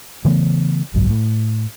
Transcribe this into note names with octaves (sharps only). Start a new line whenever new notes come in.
C#3 E3 A3 B3
F#1 B1 G#2 F#3
A2